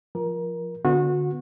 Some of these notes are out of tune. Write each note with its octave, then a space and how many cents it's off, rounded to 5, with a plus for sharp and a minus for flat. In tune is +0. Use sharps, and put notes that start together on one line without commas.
F3 +0 A#4 +20
D3 +0 B3 +5 F#4 -30